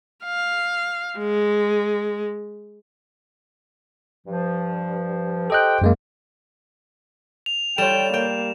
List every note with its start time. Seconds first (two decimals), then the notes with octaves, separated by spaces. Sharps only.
0.24 F5
1.18 G#3
4.27 G2 F3
5.50 G4 A4 C5 D#5 G5 F#6
5.81 F#2 G#3 A#3
7.46 F7
7.78 G3 F4 A4 C#5 G5 E7
8.14 A#3 G5